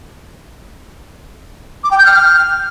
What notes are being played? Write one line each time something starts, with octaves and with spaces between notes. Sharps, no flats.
D6
G5
G6
F6